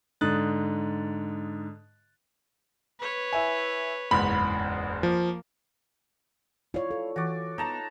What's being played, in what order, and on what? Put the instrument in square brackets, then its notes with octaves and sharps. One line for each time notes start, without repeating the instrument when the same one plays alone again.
[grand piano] G#2 D3 D#6 F#6 A6
[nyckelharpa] B4 C#5
[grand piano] E4 G#5
[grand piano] F#1 E2 G#2 [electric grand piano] B5
[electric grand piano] F3 [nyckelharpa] A#3
[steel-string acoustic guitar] E4 D5 F5 [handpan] F4 C#5
[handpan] A4
[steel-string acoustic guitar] E3 [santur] F#4 D5
[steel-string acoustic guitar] B3 D#5 [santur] D#4 A5 A#5